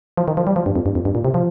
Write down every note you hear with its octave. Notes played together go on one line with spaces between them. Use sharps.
F3
D#3
F3
G3
F3
G2
F2
G2
F2
G2
A#2
C3
F3